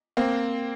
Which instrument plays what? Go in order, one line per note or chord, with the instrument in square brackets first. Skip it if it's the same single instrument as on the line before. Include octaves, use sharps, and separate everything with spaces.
[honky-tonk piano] A#3 C4